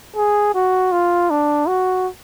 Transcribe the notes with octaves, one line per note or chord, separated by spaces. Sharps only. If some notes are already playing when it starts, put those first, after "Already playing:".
G#4
F#4
F4
D4
F#4